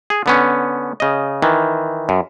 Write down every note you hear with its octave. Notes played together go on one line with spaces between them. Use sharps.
G#4
D3 B3 C#4
C#3 D#5
D#3 E3
F#2